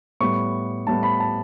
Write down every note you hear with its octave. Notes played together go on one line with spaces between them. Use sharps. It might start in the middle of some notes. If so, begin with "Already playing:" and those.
A2 G3 B3 C#6
A2 G3 B3 A5
B5
A5